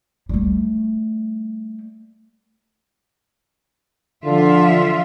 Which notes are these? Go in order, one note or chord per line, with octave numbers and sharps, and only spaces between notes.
G3 A3
D3 F3 F4 E5